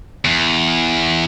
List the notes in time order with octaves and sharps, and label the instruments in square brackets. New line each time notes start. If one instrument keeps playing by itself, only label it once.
[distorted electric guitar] E2